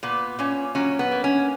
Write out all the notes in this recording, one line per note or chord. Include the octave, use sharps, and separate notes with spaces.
A#2 B3
A#2 C#4
F#3 C#4
B3
A#3
C#4